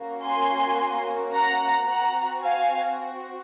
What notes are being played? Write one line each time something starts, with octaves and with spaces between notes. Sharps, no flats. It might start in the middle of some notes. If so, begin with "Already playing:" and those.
Already playing: A#3 C#4 F#4
G#5 C6
F#5 A#5
C4 F#4 F#5 A#5
F5 G#5